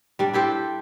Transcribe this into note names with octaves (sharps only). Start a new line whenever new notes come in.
G3 D4
E4 G4 A4 C5